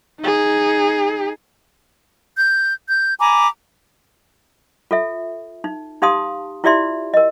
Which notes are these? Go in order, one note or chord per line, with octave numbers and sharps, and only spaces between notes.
D#4 G#4
G6
G6
G#5 A#5 B5 D6
F4 A4 E5
D#4
D#4 G4 F5 A5 C6 D#6
E4 F4 G4 D5 E5 C6
A#4 D#5